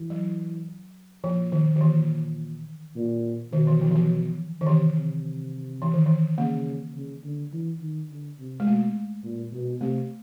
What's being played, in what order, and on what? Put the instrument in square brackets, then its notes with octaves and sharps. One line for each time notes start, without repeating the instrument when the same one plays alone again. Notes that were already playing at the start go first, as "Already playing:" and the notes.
Already playing: [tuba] E3
[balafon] F#3
[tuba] A#2 [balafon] F3
[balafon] D#3
D#3
[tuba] A#2 [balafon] E3
[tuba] A#2
[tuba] B2 [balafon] D#3
[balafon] E3
F3
E3
F3
D#3
[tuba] C3 [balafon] E3
[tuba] C3
[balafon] E3
D#3
E3
[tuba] C#3 [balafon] A#3
[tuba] C#3
D3
E3
D#3
D3
C3
[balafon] G#3
[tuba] B2 [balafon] A3
[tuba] A#2
B2
[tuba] C3 [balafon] A3